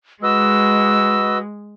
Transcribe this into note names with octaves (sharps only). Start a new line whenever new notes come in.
G#3 F#4 B4 D#5 E6